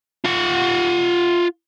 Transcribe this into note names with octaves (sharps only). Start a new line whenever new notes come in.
F4 F#5